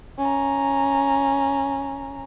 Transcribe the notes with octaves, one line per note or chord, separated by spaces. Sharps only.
C#4 A#5